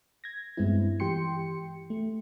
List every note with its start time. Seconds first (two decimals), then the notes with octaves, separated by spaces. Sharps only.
0.24 G#6 A#6
0.57 G2 G#3 B3 C4 E4
1.00 E3 G4 G5 C6 C#7
1.90 A3